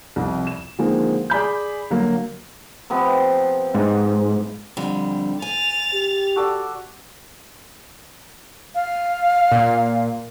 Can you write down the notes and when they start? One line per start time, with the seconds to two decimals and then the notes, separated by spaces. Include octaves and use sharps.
0.16 C2 F2
0.47 E7
0.79 D3 D#3 F3 G#3 A#3 C4
1.30 G#4 D5 B5 G6
1.90 D3 F#3 A#3
2.90 C3 F3 B3
3.75 G#2
4.77 F2 D3 G3
5.42 G#5 A6 F7
5.94 G4
6.36 F#4 A4 D5
8.75 F5
9.52 A#2